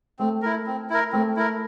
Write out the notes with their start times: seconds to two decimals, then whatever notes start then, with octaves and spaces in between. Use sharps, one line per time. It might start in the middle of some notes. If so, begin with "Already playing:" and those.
0.19 A3 C4
0.42 E4 A#4
0.67 C4
0.90 E4 A#4
1.13 A3 C4
1.37 E4 A#4